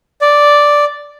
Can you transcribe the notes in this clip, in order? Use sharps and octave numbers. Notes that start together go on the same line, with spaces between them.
D5